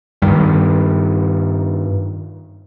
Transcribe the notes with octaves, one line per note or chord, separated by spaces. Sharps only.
G2 D#3 G3